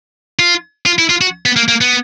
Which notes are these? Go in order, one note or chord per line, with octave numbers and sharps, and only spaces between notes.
F4
F4
E4
F4
F#4
B3
A#3
A#3
B3